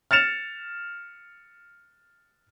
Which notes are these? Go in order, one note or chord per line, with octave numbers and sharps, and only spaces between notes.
F6 A6 C#7 E7 F7